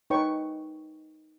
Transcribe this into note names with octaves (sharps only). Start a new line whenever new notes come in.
D#4 B4 C#5 G5 C#6